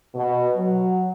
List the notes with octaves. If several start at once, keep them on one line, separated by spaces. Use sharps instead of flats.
B2
F#3